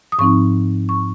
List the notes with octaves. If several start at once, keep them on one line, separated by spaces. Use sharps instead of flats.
D#6
G#2 F3 C4 D#4 C#6
C#6